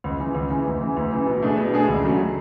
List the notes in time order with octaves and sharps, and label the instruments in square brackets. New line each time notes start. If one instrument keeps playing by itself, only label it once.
[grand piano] C#2
C#3 E3
C#2
C#3 E3
D2
C#3 E3
D2
C#3 E3
B2
A3 D4 G#4
B2
A3 D4 G#4
C#2
C#3 F#3 A3